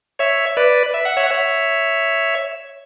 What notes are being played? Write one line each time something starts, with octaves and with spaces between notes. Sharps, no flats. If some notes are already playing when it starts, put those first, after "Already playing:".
C#5 E5
B4 D5
E5
F#5
C#5 E5
F#5
C#5 E5